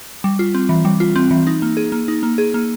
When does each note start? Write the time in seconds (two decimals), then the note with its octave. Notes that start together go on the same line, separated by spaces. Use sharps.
0.24 G3
0.39 F4
0.55 C4
0.69 E3
0.85 G3
1.00 F4
1.16 C4
1.31 E3
1.47 D#4
1.62 A#3
1.77 G#4
1.92 A#3
2.08 D#4
2.23 A#3
2.38 G#4
2.54 A#3